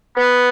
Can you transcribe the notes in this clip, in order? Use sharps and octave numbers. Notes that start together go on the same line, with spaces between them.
B3